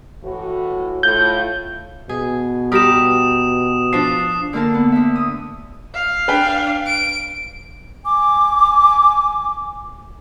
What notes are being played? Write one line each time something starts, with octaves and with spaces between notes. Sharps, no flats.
A2 E3 F#4
A2 F4 G6
B2 G#4
G3 G4 A#4 D#6 E7
F3 D4 C7
D3 A#3 A#4 A5
B3
D2 E5
D#6
F5
D4 B4 G5
D7
G#5 D6